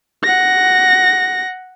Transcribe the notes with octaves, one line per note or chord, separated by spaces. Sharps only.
F#5 A#6